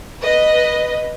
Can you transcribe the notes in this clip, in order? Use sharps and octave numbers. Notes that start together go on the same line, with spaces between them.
B4 D#5